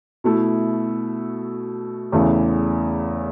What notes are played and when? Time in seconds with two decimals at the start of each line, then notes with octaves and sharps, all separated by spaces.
0.24 B2 A3 E4
2.12 E2 C#3 E3 A3